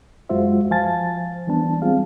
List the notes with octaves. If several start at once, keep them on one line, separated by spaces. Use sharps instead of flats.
F#2 G#3 F4 F#4 C5 E5
F3 C5 F5 G#5 A5 A6
E3 G3 B3 D4 A5
G3 C4 F4 G#4 F5